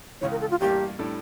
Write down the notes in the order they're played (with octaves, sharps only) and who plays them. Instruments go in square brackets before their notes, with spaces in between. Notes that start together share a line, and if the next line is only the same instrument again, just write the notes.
[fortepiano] C#2 C#3 E3 [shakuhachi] C#5
[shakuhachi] A#4
A4
F4
[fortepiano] A1 G2 E3 A#3 [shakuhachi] G4
[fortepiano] A2 G3 D4 A4